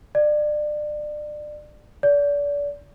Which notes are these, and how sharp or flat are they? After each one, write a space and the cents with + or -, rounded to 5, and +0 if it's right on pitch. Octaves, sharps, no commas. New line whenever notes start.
D5 +30
D5 -35